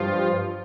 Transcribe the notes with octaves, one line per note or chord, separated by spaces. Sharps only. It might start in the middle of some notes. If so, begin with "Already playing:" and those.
Already playing: G2 F3 F4